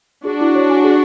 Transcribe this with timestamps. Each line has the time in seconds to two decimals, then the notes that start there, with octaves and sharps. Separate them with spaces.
0.25 D4 F#4 G#4
0.41 E4
0.55 C#5
0.70 G#5
0.84 G#4